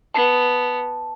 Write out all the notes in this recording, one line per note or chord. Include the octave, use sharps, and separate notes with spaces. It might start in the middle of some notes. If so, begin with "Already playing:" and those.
B3 A5